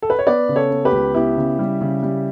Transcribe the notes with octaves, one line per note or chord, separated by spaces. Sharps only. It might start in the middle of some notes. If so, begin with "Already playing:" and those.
A4
B4
C#5
B3 B4 D5
C#3
A4 C#5
B3
G4 B4
C#2
B3 E4 G4
C#3
G3
C#3
G3